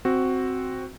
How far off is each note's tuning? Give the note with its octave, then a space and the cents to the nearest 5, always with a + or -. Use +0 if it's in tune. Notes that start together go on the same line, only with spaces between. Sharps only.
C4 +0 F#4 +0